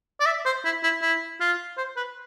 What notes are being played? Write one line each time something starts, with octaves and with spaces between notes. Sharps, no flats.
D5
E5
C5
E4
E4
E4
F4
C5
B4